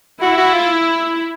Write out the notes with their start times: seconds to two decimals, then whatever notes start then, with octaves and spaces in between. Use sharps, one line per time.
0.22 E4 F#4
0.37 F#4
0.54 F4